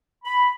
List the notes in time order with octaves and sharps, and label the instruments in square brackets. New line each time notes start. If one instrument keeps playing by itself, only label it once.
[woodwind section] B5